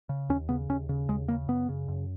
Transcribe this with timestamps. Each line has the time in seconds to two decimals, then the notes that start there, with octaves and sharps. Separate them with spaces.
0.09 C#3
0.29 D#2 C#4
0.49 C#3 B3
0.69 D#2 C#4
0.89 C#3
1.09 D#2 G#3
1.28 C#3 A#3
1.48 F#2 B3
1.69 C#3
1.88 F#2